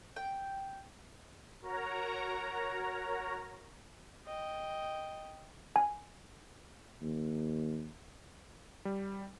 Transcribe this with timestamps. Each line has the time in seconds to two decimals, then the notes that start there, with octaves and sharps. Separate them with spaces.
0.16 G5
1.62 F#4 A#4 C#5 A#5
4.26 D#5 G5
5.76 G#5
7.02 D#2
8.85 G3